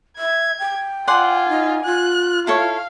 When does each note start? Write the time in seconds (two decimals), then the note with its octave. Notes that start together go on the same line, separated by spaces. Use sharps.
0.18 E5 G#6
0.59 G5
1.08 F4 D5 F#5 G#5 C6
1.49 D#4
1.85 F4 F#6
2.47 E4 A4 C#5 F5